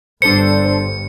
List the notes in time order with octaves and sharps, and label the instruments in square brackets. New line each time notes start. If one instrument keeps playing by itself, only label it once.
[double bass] G1 G2 [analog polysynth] D4 A4 C5 [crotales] C#7